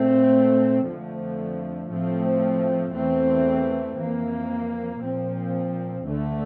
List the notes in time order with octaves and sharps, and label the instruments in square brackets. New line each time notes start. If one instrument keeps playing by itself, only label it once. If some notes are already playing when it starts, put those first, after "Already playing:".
Already playing: [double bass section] A#2 A3 C4
F2 D3 F3 A3
A2 F3 A3 C4
E2 E3 A3 C4
F2 E3 A#3
A#2 F3 C4
D2 D3 A3